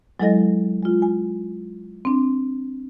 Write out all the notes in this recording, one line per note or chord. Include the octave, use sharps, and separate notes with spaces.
F#3 G#3 E4 A4 D#5 A#6
G#3 F4
G#5
C4 D4